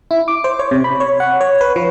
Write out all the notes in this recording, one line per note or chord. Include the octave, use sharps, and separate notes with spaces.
E4
D6
C5
C#5
C3
B5
C#5
F#5
C#5
B4
F3